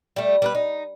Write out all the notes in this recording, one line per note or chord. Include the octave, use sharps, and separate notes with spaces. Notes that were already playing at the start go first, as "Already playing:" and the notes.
G3 A3
G3 A#4 B4
D#4